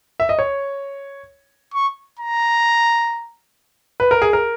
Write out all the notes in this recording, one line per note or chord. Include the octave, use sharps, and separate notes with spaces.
E5
D#5
C#5
C#6
A#5
B4
A#4
G#4
A#4